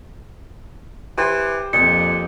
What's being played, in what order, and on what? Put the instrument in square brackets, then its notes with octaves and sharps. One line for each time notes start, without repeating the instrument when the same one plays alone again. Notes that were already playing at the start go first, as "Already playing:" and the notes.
[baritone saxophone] E3 [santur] G4 C5
[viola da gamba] F2 [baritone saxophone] A#2 [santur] D#5 [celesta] C#7